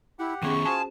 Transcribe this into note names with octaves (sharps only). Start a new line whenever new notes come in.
E4 G4 F#5
D#3 B3 C#4 G#4 C#6
F4 F#4 G#4 C5 G#5 A5